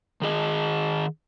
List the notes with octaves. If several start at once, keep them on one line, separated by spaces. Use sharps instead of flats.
D#3 G#4 D#5